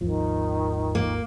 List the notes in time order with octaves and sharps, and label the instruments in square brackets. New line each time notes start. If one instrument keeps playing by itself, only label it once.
[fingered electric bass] G#1 D#2 F3 [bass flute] D#3
[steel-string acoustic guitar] A#3